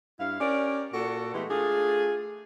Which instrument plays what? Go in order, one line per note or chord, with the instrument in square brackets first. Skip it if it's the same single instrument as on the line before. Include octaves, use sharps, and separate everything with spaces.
[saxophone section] G2 E4 F5
C#4 G4 A#4 D5
A#2 F#4 A4
E3 G#3 A3 B3 G4
A3 D4 F4 G#4